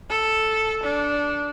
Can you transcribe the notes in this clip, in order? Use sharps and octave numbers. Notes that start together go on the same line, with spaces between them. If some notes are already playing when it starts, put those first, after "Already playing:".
A4
D4